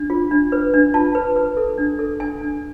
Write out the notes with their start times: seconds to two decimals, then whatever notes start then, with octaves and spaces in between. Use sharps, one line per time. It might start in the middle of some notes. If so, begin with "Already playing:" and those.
Already playing: D4
0.10 F4
0.31 D4
0.52 B4
0.74 D4
0.94 F4 A5
1.15 B4
1.36 B4
1.57 A4
1.78 D4
1.99 A4
2.20 D4 G#5
2.41 D4